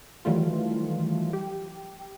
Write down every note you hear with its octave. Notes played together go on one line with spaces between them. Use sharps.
D#3 E3 F#3 G3 A3 F4
G4